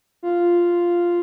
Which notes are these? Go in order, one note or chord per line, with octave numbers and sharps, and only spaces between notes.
F4